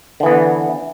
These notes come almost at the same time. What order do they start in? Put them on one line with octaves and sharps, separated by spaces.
D3 E3 B3